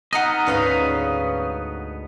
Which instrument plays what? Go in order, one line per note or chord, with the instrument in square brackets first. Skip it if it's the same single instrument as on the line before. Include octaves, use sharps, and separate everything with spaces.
[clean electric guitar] B3 D#4 D#5 [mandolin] F#5 A#5 F6
[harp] D2 G#2 [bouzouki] C#4 B4 F5